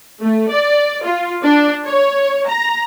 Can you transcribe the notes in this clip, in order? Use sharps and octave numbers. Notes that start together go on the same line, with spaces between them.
A3
D5
F4
D4
C#5
A#5